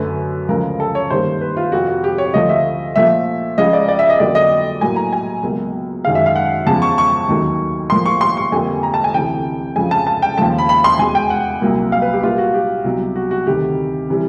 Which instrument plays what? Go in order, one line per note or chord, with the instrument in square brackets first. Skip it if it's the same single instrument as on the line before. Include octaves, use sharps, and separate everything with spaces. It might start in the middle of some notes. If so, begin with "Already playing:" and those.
Already playing: [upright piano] F#2 D3 F#3 A3 B4
D2 C#3 F3 G#3 A#4
A4
C#5
G2 D#3 G3 A#3 C5
B4
F4
F2 C3 F3 F#4
F#4
G4
C#5
D2 D3 F3 A3 D#5
E5
A#2 F3 A3 E5
C#2 C#3 F3 D#5
D5
D5
E5
D#5
F2 D3 F#3 A#3 D5
D#5
A2 F#3 A#3 G#5
A#5
G#5
C#2 B2 F#3 A#3
F#2 D#3 G#3 F5
E5
F5
F#5
E2 C#3 F3 G#3 A5
C#6
C#6
D#2 D#3 F#3 A3
A2 F3 A#3 C6
C#6
C6
C#6
F2 D3 G3 A#3 G#5
A#5
A5
G#5
D2 C3 E3 G5
F2 C#3 F3 G#5
A5
A5
G5
D#2 C#3 F3 A3 A5
B5
B5
C6
E2 B2 G#3 G#5
G5
F#5
C2 A#2 F#3 A#3
F5
B4
G4
A#2 G3 A#3 F4
F#4
G4
C2 B2 F#3
F#4
F#4
D2 C3 D#3 G4
C3 E3 G3